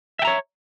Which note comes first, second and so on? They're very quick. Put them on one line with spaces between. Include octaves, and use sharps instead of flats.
E5 G5 A#5 C#5